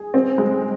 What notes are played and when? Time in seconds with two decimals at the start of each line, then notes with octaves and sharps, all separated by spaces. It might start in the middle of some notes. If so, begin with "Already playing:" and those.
Already playing: G#4
0.14 C4
0.38 G#3